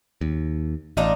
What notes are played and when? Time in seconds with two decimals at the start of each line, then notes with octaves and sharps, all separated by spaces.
0.21 D#2
0.97 A1 D4 D#4 F4